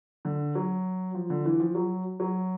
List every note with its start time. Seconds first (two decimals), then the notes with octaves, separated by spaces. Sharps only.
0.25 D3
0.55 F#3
1.15 F3
1.30 D3
1.45 E3
1.60 F3
1.75 F#3
2.20 F#3